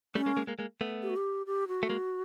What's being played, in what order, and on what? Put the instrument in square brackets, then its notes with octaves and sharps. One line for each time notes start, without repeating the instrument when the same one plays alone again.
[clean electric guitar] G3 A3 [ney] C#4
[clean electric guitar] G#3 A#3
G#3 A#3
G#3 A#3
G#3 A#3
A3 B3
[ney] G4
F#4
G4
G4
F#4
[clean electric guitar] A3
G#3 A#3